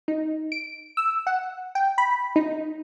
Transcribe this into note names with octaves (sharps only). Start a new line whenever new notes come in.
D#4
D7
E6
F#5
G5
B5
D#4